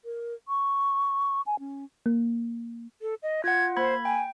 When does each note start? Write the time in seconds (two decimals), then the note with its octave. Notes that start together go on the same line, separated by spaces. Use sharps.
0.05 A#4
0.48 C#6
1.47 G#5
1.59 C#4
2.06 A#3
3.02 A4
3.23 D#5
3.44 F4 F#5 G#6
3.77 A#3 C5 B5 G#6
4.05 G5 G#5